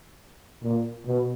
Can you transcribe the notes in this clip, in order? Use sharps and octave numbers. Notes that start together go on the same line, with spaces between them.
A#2
B2